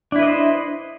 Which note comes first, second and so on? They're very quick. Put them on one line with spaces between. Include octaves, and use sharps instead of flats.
D4 E4 B4 D#5 C5